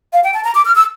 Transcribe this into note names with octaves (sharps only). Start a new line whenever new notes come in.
F5
G5
A5
A#5
D6
F6
E6